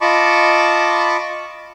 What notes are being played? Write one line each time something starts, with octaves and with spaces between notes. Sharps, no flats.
F4 D#5 A5 B5 C#6 D6